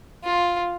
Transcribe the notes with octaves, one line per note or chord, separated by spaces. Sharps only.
F4